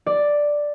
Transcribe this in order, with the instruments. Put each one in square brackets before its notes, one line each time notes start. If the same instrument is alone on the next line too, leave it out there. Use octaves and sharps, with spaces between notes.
[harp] D5